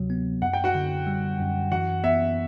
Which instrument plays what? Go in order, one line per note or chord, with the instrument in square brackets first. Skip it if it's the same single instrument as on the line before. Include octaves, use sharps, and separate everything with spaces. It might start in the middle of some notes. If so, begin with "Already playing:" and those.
Already playing: [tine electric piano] D2 C3 F#3
B3
[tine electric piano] F#2 [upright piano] F#5
[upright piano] G5
F#4 F#5
[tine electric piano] D3
G3
F#2
[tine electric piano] E3 [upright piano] F#4 F#5
[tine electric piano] B3 [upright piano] E5